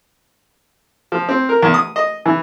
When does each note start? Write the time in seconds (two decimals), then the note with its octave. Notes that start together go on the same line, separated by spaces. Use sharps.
1.12 F3
1.29 C4
1.49 A#4
1.63 E2
1.74 D#6
1.96 D#5
2.26 E3